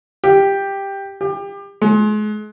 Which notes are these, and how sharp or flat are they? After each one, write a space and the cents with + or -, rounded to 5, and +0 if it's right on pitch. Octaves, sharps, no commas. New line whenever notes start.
G4 +5
G4 +30
G#3 +35